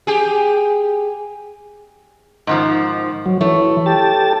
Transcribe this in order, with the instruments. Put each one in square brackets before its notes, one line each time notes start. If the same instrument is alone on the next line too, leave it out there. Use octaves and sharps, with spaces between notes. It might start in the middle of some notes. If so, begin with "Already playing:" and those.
[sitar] G4 G#4
[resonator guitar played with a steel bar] G#2 D#3 F3
[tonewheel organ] F#3
[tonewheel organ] E3 [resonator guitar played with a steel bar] A3 C#5
[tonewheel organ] G4 A5